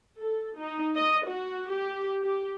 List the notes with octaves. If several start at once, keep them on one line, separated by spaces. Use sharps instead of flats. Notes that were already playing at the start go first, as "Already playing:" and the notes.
A4
D#4
D#5
F#4
G4
G4